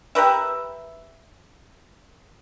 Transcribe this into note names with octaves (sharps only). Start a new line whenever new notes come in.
G4 A#4 B4 E5